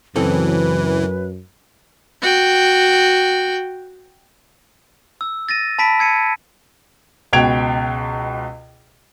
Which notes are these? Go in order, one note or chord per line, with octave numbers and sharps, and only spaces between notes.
C#2 F#2 E3 C4 A4 B4
F#4 G5
E6
A6 A#6 D#7
A5 B5 B6 D7
E6 G#6 C#7 D#7
C#2 B2 G5 G#6 D7 F7